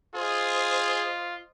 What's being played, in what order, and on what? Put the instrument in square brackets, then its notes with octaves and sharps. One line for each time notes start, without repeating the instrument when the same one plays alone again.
[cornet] F4 [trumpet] G#4 [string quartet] C5 D#5